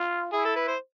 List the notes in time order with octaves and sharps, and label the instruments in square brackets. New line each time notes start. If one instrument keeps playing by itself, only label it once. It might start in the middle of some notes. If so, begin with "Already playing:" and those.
Already playing: [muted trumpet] F4
[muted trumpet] E4 [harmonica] G#4
[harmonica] A4
B4
C5